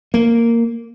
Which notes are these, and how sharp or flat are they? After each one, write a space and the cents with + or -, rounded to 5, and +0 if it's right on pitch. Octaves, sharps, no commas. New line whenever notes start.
A#3 -10